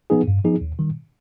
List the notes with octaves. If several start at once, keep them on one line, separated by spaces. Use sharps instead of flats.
F3 B3 D#4 G#4
G2
F3 B3 D#4 G#4
D#2
D#3 G3